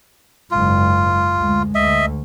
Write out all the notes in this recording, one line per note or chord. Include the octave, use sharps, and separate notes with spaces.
F#1 G#2 F4
D2 G#3
D2 D#5 E5